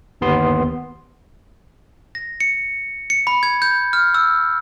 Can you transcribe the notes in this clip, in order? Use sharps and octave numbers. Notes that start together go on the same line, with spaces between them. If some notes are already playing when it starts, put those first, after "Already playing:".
G1 D#2 B3 C6
A#6
C#7
C#7
B5
G#6
G6
F6
E6